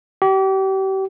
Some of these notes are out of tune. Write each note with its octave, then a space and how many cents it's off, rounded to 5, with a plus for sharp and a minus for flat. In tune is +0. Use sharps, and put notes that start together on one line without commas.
G4 -35